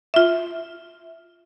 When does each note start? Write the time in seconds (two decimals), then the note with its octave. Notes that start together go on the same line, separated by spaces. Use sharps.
0.14 F4 E5